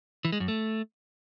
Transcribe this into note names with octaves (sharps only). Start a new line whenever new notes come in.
E3
G#3
F#2
A3